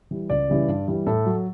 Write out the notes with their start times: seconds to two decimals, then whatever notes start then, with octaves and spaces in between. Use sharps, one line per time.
0.11 E3 G3
0.30 C#2 D5
0.49 C#3 E3 G3
0.68 G2
0.88 E3 G3
1.07 A2 A4
1.26 F#3